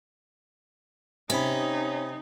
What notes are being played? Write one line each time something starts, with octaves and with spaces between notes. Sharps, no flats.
C3 C#4 D#4 B5